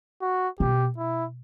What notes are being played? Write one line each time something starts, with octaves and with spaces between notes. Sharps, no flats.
F#4
B2 G4
E4